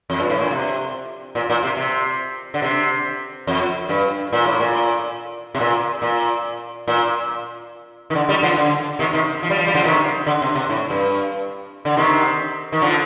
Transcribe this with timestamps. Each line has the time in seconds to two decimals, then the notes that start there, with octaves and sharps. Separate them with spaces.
0.10 F2
0.19 G2
0.30 A2
0.40 A#2
0.51 C3
1.35 A#2
1.50 A#2
1.63 C3
1.77 C3
2.54 D3
2.62 C3
3.47 F2
3.89 G2
4.33 A#2
4.46 A2
4.60 A#2
5.55 C3
5.60 A#2
6.02 A#2
6.88 A#2
8.10 D#3
8.15 D3
8.29 D#3 G3
8.42 D3 F3
8.58 D3
8.99 C3 D#3
9.13 C3 D#3
9.43 F3
9.50 G3
9.58 F3
9.67 G3
9.75 D3 F3
9.84 C3 D#3
10.27 D3
10.42 C3
10.55 C3
10.69 A2
10.90 G2
11.85 D3
11.97 C3 D#3
12.72 D#3
12.82 D3 F3